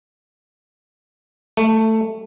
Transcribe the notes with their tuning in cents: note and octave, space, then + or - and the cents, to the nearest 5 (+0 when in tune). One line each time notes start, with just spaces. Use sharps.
A3 +10